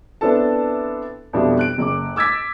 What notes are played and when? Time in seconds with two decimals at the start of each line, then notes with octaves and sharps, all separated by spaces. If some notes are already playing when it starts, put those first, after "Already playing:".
0.21 B3 C4 D4 E4 A4 A5
1.33 F2 B2 G3 D4 E4
1.59 F#6 D7
1.78 F#1 D6
2.16 D6 E6 G#6 A6 B6